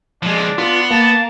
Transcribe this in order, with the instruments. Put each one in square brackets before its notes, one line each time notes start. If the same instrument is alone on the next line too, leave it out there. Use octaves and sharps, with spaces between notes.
[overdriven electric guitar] F3 G#3 [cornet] D4
[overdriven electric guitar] B3 [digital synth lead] F4
[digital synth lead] A#3 [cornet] A5